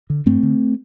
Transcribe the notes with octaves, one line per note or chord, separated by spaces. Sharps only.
D3
G2 A3 C4
D3